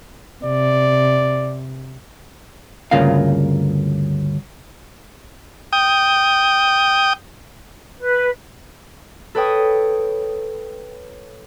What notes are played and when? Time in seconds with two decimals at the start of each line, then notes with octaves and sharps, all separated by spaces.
0.45 C3 D5
2.91 D2 G2 C#3 A#3 F4 F5
5.73 G5 D#6
7.99 B4
9.35 A4 B4 C#5 G5 D#6